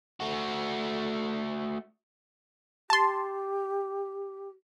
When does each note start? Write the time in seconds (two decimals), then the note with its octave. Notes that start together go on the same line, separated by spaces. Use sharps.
0.20 A3 F#4
2.90 G4 A5 C6